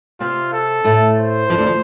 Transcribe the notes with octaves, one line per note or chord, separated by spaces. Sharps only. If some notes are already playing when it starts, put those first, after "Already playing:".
C3 C4 F4
A4
A2 A3
C5
F2 F3
D2 D3
F3